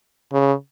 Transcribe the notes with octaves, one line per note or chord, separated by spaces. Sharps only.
C#3